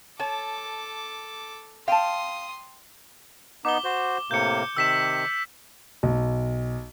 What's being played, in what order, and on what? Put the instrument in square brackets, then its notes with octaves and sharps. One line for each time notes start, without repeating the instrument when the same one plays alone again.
[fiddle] A4 D6 [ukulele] C#5 [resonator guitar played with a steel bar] A5
[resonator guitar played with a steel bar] F5 [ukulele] G5 A5 [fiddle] C6 D#6
[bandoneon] B3 D#4 [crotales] D6 G7
[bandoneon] F#4 C5
[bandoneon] A2 C3 A#3 [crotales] G6 C#7
[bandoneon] C3 D#3 [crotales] E6 B6 E7
[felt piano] B1